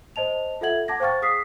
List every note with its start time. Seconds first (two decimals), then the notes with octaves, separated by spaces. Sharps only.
0.16 C5 D#5 A5 F7
0.61 F4 A4 E5 F#5 G#6 F#7
0.88 F#5 A5 D6 G#6 A#6
1.00 C5 F5 G5 C#6 F6 A6
1.22 G#4 D#6 F6 B6 C7